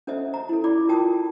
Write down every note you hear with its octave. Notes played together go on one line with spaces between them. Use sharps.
C#4 A4 C5 D#5 E5
A#5
E4 A4
E4 D5 B5 D6
F4 A#4 G5 A5 D#6